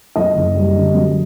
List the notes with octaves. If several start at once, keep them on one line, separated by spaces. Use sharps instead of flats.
F#2 D#5
F#1
G3
D3
F#2